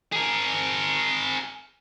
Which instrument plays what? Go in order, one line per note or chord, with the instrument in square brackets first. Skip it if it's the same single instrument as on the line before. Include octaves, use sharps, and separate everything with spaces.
[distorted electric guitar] G#4 A#4